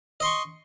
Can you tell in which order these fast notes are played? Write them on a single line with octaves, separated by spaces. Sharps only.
D#5 C6 C#6